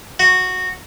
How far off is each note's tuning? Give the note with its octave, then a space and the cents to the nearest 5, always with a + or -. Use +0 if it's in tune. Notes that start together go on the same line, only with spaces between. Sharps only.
F#4 -5